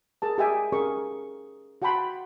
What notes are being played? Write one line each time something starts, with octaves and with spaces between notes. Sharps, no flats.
G#4 A#4 A5
G4 G#4 D#5 E5 G5 G#5
C#4 G#4 A#4 D#5 C#6
F#4 F#5 G5 A5 B5 C6